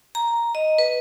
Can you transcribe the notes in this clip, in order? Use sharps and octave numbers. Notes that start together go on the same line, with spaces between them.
A#5
D#5
B4